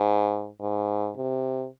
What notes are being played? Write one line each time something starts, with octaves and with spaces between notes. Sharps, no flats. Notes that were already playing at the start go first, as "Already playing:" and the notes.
Already playing: G#2
G#2
C3